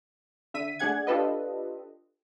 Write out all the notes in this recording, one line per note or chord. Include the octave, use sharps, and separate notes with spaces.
D3 E5 B6 D#7
A3 D4 G#4 F#5 G#6
D4 F4 G4 A4 B4 D#5